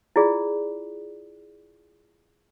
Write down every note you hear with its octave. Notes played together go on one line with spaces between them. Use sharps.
E4 F4 G#4 D5